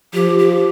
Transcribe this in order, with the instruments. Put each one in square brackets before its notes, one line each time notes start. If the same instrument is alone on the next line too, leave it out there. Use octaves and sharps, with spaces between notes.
[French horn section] F3 [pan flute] G4
[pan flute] G4